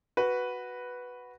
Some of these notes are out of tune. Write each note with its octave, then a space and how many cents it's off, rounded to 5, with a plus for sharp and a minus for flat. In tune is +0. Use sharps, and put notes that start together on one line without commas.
F#4 +0 B4 +0